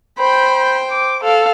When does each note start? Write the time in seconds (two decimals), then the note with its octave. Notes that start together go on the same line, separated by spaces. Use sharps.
0.18 C5 G5 B5
0.90 D6
1.23 A4 F5